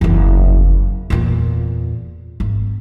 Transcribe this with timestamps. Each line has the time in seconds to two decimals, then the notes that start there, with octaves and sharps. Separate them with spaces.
0.01 F#1 E2
1.10 E2 A#2
2.40 G#1